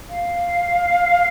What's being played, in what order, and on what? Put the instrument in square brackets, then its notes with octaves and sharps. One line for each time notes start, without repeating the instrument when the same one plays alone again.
[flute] F5